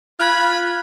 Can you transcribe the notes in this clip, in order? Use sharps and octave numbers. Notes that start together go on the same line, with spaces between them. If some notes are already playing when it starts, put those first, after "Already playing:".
F4 B5 F6 F#6 G#6